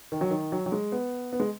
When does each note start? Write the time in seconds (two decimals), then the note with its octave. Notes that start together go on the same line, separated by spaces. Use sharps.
0.12 D#3
0.21 F#3
0.30 D#3
0.52 F#3
0.66 F#3
0.72 G#3
0.92 B3
1.33 B3
1.40 G#3